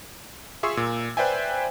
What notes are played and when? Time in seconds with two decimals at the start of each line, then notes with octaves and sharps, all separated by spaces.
0.63 F4 G#4 E5 C6 C#6 E6
0.77 A#2
1.17 B4 C5 D5 E5 G5 G#5